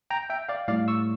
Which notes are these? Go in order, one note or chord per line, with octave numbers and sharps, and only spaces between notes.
G5 A#5
E5 G5
D5 F5
A2 G3 D5 F5
C#6 E6